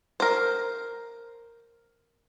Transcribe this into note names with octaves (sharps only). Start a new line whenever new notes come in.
A#4 C5